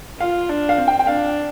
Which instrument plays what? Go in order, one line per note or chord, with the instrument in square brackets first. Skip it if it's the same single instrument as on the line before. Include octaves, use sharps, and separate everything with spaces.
[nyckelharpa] F4 [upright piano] F5
[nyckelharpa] D4
[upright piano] F5
[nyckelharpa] C4
[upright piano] G5
G5
[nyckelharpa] D4 [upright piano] F5